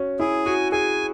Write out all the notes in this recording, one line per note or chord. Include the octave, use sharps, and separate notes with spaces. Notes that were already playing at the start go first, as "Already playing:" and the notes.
Already playing: C#4 F#4
E4 G#4
F#4 G#5
G#4 G#5